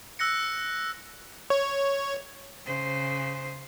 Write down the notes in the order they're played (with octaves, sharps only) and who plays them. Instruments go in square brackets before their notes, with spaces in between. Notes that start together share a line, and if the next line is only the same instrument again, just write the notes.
[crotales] E6 F#6 A#6 C#7
[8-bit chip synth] C#5
[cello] C#3 C5